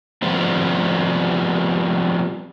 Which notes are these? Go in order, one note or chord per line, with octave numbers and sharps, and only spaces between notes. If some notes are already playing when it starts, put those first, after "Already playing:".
F3 G3 B3 C4